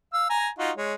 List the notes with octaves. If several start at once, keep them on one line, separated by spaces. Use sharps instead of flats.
F5 E6
G#5 A#5
D#4 F4 F#4
G#3 C#5